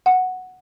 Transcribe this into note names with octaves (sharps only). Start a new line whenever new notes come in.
F#5